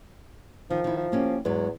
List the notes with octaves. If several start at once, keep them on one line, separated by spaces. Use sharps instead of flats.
D#3 F3
D#3 E4
F3
A#3 C#4 G4
E2 G#2 F#3